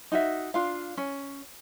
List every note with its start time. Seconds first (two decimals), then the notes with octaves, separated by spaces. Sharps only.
0.12 D#4 F#4 E5
0.54 D4 F4 F5
0.97 C#4